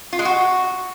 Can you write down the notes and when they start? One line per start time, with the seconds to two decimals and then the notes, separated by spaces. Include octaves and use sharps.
0.13 F4
0.19 G#3
0.25 F#4